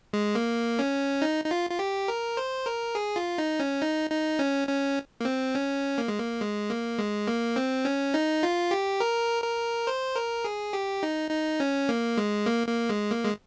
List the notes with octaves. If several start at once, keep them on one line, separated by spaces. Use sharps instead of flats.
G#3
A#3
C#4
D#4
D#4
F4
F4
G4
A#4
C5
A#4
G#4
F4
D#4
C#4
D#4
D#4
C#4
C#4
A#3
C4
C#4
A#3
G#3
A#3
G#3
A#3
G#3
A#3
C4
C#4
D#4
F4
G4
A#4
A#4
C5
A#4
G#4
G4
D#4
D#4
C#4
A#3
G#3
A#3
A#3
G#3
A#3
G#3